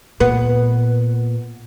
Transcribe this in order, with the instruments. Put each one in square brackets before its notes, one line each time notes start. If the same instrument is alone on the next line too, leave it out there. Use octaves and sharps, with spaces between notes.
[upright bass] A#2 [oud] B3